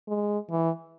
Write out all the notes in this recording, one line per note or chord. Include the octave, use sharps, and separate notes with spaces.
G#3
E3